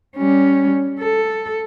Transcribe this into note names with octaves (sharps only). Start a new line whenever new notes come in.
G3 C#4
A4